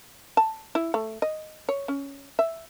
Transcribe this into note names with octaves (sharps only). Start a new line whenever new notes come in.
A5
E4
A3
D#5
C#5
C#4
E5